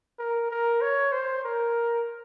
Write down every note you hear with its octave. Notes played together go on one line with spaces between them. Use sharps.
A#4
A#4
C#5
C5
A#4